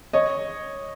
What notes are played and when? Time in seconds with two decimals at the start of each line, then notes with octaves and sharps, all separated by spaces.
0.13 C#5 D#5